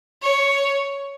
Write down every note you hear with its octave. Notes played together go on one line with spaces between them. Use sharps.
C#5